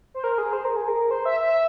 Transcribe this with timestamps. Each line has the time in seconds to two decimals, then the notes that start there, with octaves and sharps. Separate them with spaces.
0.14 C5
0.24 A#4
0.38 G#4
0.53 C5
0.65 A#4
0.76 G#4
0.88 A#4
1.11 C5
1.25 E5
1.40 E5